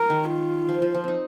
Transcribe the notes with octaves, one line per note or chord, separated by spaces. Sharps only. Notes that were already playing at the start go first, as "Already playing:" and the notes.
Already playing: A#4
D#3
F4
F3
F3
F3
C4 D#4